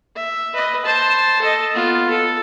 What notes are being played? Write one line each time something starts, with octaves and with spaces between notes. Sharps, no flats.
E5
B4 D#5
C5 A5
A4 D#5
B3 F4
A4